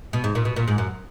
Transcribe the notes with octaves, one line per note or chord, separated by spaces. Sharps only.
B2
G#2
A#2
B2
A#2
G#2
F#2